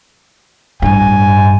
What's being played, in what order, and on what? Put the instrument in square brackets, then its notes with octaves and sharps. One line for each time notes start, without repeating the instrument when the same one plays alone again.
[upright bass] A1 G2 [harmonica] G#5